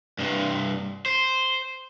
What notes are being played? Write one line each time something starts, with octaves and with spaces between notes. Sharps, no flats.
G2 C3
C5